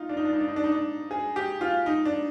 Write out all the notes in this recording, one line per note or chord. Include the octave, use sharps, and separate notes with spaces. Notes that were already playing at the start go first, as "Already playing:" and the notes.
Already playing: D#4 F4
D4
D#4
D4
D#4
D4
D#4
D4
D#4
D4
G#4
G4
F4
D#4
D4